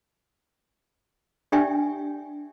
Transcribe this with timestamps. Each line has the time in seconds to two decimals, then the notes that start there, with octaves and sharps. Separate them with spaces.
1.52 D4 G4 D5 E5 G5 G#5